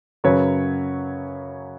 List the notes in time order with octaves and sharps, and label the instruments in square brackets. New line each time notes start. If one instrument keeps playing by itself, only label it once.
[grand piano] F#2 C#3 F#3 B4 C#5